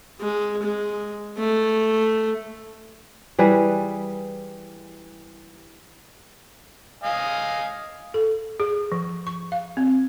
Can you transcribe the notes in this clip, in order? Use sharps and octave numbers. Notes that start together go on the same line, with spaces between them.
G#3
G#3
A3
E3 G3 G#4 B4
D#5 F5 G#5
A4
G#4
F3
C#6
F5
C4